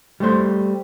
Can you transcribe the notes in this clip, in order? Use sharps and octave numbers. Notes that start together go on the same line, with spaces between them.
G3 A3 C5